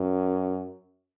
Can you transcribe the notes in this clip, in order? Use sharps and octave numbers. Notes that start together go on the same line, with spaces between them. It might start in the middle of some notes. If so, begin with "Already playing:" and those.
Already playing: F#2